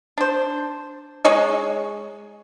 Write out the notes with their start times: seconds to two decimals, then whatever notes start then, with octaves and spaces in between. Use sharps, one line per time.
0.18 D4 C5
1.25 G#3 G#4 C#5 D#5